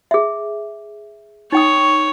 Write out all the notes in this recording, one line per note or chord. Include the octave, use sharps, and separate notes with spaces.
G#4 E5
D#4 C#5 G5 D#6